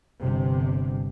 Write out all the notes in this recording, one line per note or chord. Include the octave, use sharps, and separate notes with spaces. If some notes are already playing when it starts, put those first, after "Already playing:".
G1 C3